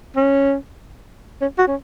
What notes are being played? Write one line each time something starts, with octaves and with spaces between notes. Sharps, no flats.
C#4
C#4
F#4
C#4